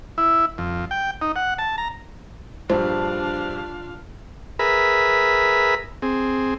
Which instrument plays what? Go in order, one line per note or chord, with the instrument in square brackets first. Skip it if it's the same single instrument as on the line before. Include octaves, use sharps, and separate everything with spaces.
[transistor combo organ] E4
F2
G5
D#4
F#5
A5
A#5
[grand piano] A#1 G2 [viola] D4 F5 [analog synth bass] F4 [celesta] C5
[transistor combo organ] G#4 A#4 B4 E5 B5
C4 G#4